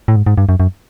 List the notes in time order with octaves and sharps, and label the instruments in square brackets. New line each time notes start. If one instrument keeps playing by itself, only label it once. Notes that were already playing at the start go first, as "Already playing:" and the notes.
[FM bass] A2
G#2
G#2
G2
F#2
F#2